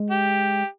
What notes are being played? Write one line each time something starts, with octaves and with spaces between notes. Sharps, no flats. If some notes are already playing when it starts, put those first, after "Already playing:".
Already playing: G#3
G4